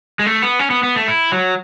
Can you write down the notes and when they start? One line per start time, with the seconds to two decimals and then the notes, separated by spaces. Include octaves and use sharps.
0.19 G#3
0.26 A3
0.42 B3
0.59 C#4
0.70 B3
0.83 B3
0.96 A3
1.08 E4
1.32 F#3